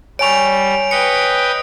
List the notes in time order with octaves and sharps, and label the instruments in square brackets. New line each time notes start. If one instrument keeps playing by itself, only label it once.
[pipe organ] G3 [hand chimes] C#5 G#5 C#6 [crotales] D7 F7
[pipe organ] B4 D#5 G5 [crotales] C#7